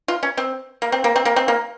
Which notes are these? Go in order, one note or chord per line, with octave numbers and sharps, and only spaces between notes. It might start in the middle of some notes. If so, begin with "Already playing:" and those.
F4
C#4
C4
A#3
C4
A#3
C4
A#3
C4
A#3